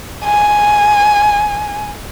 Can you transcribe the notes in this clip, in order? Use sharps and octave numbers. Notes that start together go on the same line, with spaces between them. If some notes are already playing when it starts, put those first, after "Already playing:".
G#5